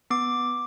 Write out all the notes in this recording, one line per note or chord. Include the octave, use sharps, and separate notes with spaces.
B3 D6